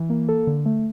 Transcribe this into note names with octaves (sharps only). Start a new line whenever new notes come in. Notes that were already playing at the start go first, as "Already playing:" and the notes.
Already playing: E3
A#3
A4
D3
A3